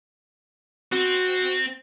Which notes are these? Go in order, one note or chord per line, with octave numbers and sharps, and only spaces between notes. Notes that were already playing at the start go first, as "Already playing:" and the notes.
C4 F#4